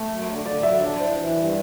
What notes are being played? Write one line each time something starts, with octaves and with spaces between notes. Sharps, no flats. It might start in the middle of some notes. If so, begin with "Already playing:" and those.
Already playing: A3
F#2
D3
D3 D5
F#3 E5
D4 D5
E3 C5
E3
G2